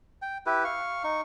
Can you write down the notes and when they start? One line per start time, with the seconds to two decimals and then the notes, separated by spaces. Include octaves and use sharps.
0.22 G5
0.46 E4 G4 B4
0.64 F5 C#6
1.04 D#4 C#6